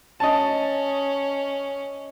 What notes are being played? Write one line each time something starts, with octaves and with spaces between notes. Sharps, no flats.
C#4 D#5 A5